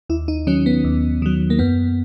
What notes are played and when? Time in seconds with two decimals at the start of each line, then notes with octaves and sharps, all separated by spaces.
0.09 D#2 E4
0.28 D#4
0.47 D#3 F#3 C#4
0.66 B3
0.84 D#2
1.22 D#3 F#3
1.50 A#3
1.59 F#2 B3